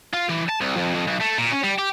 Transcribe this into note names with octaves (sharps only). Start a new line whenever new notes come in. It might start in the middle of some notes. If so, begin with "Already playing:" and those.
F4
E3
A5
C2
F2
F2
B1
A3
A#2
C#4
G3
G4